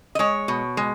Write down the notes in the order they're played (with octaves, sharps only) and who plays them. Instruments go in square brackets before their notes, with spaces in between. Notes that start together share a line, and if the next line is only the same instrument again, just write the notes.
[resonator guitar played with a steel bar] D#5
G#3 C#5
B2
G#3